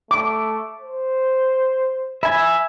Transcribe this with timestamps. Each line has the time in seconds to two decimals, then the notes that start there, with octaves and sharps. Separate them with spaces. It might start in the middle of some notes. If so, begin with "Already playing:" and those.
0.11 A3 D6
0.80 C5
2.23 E5 G#5 B5